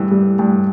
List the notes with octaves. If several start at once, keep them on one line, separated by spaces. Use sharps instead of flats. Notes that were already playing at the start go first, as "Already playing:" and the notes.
Already playing: G2 E3
G3
G2